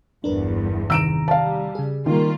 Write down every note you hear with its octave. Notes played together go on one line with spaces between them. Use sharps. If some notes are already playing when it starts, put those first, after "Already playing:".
G1 E2 G2 D4 A#4 B4
C3 D#3 A#5 E6 D7 E7
G3 F5 A5
C#3 G#4
D#3 G3 A#3 F4